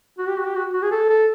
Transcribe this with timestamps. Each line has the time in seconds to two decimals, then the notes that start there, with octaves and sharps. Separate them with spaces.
0.18 F#4
0.28 G4
0.36 F#4
0.46 G4
0.55 F#4
0.73 F#4
0.82 G#4
0.91 A4
1.09 A4